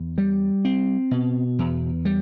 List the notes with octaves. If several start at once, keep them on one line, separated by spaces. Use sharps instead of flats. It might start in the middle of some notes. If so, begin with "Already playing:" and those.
Already playing: E2
G3
C4
B2
E2
G3